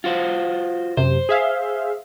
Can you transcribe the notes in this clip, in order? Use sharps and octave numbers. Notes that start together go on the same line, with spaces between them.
F4 F#4 C5
F#2 C3 C5
G#4 E5 F5